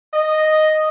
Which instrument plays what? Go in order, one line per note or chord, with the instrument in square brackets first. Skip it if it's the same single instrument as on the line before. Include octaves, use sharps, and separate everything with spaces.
[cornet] D#5